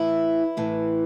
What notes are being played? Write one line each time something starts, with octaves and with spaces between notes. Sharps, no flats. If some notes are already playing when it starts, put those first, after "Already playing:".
Already playing: A2 E3 E4
A2 E3